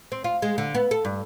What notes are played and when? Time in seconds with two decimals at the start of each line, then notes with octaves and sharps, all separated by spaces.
0.12 C4
0.24 F4
0.42 G#3
0.58 D3
0.75 B3
0.91 A4
1.05 G2